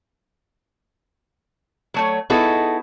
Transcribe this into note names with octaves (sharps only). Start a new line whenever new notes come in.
F#3 A3 C#5
B3 D#4 E4 F#4 G#4 A4